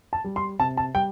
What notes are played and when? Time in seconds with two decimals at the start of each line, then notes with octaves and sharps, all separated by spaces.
0.13 A5
0.24 G3
0.36 C6
0.59 C3 A5
0.77 A5
0.95 G3 G5